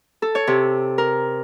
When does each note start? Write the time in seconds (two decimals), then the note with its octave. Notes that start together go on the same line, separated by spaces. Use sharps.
0.22 A4
0.35 C#5
0.47 C3
0.98 A#4